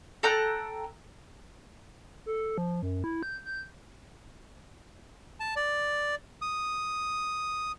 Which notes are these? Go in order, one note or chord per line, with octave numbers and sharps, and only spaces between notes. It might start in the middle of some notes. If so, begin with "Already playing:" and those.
A4 G5 A#5 F#6
A4
F3
F#2
E4
G6
G6
A5
D5
D#6